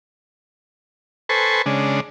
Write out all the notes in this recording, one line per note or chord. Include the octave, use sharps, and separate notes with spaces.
A4 B4 C5 G#5 C#6
C#3 G#3 D4